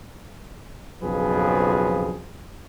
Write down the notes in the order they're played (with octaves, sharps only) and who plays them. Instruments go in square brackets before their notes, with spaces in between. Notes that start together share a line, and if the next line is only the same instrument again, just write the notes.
[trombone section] B1 F2 C#3 F3 G#4 B4